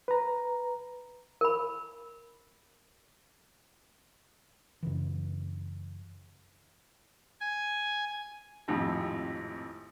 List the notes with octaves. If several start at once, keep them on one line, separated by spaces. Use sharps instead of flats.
B4 A#5
A#4 B5
F#2 C#3 E3
G#5
G#1 F2 A2 G4